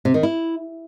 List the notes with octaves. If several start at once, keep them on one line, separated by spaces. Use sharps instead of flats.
C3
D#3
E4